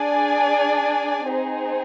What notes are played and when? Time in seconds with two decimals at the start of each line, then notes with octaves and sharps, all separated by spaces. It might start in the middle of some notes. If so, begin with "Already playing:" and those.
Already playing: D4 G#4 D5 G#5
1.31 C4 D#4 G#4 C5